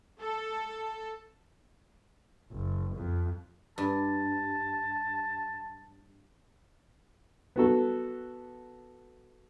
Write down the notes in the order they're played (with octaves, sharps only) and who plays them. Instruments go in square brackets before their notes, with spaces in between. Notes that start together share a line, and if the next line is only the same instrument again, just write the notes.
[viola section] A4
[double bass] F#1
F2
[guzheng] G2 [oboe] A5
[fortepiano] B3 F#4 A4